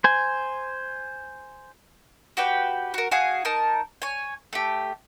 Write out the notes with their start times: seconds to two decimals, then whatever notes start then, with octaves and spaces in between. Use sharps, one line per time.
0.04 C5 G#5
2.37 F#4 G4 B4 G5
2.94 F#4 A#4
3.11 F#4 G#4 F5 G#5
3.45 D#4 A#4 A5
4.02 C#5 G#5
4.53 A3 G4